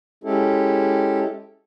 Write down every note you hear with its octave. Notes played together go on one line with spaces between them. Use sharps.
G#3 C#4 E4 G4 A4